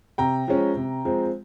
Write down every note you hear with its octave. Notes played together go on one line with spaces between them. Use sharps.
C3 G5 A#5
F3 G#3 C#4
C3
F3 G#3 C4